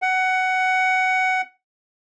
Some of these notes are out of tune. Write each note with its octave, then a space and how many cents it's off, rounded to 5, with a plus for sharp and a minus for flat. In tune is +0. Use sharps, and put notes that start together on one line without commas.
F#5 +15